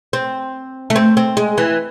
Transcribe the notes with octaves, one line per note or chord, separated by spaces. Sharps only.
C4
A3
C4
C4
G#3
E3